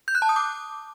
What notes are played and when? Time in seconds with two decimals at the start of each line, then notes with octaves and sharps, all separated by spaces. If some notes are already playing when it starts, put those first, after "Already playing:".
0.08 G6
0.15 F#6
0.22 A5
0.29 D#6
0.36 D6